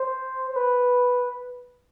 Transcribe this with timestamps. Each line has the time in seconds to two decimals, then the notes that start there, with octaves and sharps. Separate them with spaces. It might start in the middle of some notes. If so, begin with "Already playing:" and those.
Already playing: C5
0.51 C5
0.56 B4